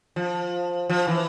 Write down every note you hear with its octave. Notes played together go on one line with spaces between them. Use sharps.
F3
F3
E3